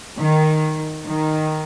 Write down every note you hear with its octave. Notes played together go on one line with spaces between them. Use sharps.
D#3
D#3